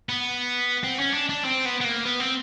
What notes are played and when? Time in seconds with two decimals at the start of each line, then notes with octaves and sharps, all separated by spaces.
0.09 B3
0.84 C4
1.00 C#4
1.14 D4
1.29 D4
1.44 C4
1.65 B3
1.81 B3
1.84 A#3
2.05 B3
2.20 C4